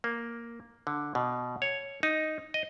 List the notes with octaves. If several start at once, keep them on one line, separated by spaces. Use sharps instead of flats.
A#3
D3
B2
C#5
D#4
D#5